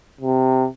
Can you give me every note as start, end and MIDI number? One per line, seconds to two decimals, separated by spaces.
0.21 0.67 48